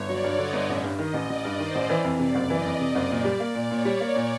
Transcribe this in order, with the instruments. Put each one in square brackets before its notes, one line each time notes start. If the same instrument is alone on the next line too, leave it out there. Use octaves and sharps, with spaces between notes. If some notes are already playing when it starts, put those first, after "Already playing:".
Already playing: [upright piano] G1 [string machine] C#5
[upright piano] F#3 [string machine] D5
[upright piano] G2
[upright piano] D3 [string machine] D#5
[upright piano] G1
[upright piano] A1 [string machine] E5
[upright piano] G2
[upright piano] D#3 [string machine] D#5
[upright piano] A1
[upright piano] A1 [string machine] D5
[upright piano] G2
[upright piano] D#3 [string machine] C5
[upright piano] A1
[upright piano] E3 [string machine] D5
[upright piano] F2
[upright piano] C3 [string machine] D5
[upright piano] F#1
[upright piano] E3 [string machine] D#5
[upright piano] F2
[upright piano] C3 [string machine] D#5
[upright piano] F#1
[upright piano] A#2 [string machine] D5
[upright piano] G3
A#3
A#2
[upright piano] A#2 [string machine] C#5
[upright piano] G3
A#3
A#2